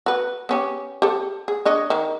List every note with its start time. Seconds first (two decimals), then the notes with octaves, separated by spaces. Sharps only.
0.06 F#4 B4
0.49 B3 C#4 G4
1.02 G4 A4
1.48 G#4
1.65 D4 C#5 D#5
1.90 D#3